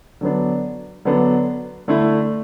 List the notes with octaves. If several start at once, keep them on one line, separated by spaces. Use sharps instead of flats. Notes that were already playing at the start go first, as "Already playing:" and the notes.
D3 F#3 B3 D4
D3 F#3 B3 D4
D3 A3 E4